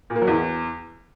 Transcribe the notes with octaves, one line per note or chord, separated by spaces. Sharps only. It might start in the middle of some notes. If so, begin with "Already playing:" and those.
A#2
A#3
F#3
E2